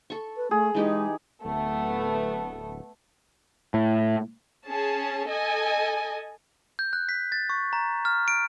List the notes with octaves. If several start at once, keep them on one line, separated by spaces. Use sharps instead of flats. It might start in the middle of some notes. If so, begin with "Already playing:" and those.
A4 C#6
B4
A3 G#4
E3 G#3 D#4 G4
D1 A3 B3
A2
C#4 G#4 A5
A4 D#5 G#5
G6
F#6
B6
A6
C#6
A#5
F6
D7